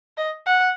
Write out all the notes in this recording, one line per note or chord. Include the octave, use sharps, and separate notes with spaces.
D#5
F#5